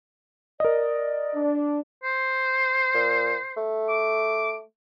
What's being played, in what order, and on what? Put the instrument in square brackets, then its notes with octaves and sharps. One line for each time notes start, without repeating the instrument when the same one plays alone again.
[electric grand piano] A#4 D#5 [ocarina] D5
[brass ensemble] D4
[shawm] C5
[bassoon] A#2
A3
[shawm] D6